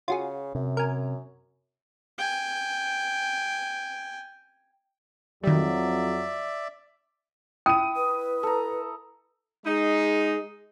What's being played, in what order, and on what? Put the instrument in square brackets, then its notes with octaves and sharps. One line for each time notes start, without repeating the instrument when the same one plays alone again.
[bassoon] C#3 [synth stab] F4 F#4 G#4
[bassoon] F#2 [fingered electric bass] C3
[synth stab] A#4 G#5
[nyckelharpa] G5 G#5
[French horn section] F2 F#3 [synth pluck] D#3 G3 [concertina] D5 E5
[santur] E4 [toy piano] G5 [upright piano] D#6 D#7
[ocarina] B4
[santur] A4 A#5
[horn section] G#3 D#4 [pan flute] G#4